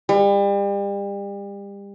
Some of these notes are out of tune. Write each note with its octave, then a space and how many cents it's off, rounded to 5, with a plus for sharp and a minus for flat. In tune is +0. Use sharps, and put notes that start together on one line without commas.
G3 +35